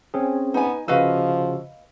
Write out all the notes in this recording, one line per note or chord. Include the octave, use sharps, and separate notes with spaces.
C4 C#4 G#4
B3 D#4 G#5
C#3 F3 F#4 B4 D#5 F5 E6